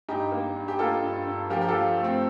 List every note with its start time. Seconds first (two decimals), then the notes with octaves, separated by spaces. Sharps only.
0.08 G2 D#4 G4
0.32 A#3
0.56 G2
0.68 G4
0.79 A#3 F4 A4
1.03 G2
1.27 G2
1.50 F3 G4 A#4
1.61 G4
1.68 F4 A4
1.74 F3
1.98 A3
2.04 C4